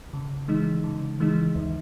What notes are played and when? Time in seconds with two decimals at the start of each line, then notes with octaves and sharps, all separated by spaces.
0.13 C#3
0.48 E3 G#3 D#4
0.84 C#3
1.20 E3 G#3 D#4
1.55 D#2